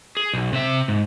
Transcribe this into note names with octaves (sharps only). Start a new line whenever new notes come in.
G#4
B1
C3 E5
G#2